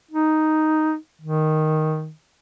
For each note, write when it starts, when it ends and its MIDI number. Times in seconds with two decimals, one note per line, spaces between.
0.11 0.95 63
1.22 2.11 51